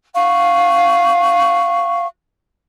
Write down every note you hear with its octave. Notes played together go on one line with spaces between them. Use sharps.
F5 F#5 C#6